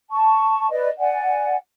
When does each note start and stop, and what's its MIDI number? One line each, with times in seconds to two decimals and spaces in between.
0.10 0.70 81
0.10 0.70 85
0.71 0.89 71
0.71 0.89 74
0.71 0.89 75
0.99 1.55 74
0.99 1.55 78
0.99 1.55 80